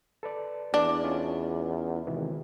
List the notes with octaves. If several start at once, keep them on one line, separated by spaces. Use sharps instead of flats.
A4 B4 D5
E2 D4
C#4 F4 D#5
G#1 C3 D#3 E3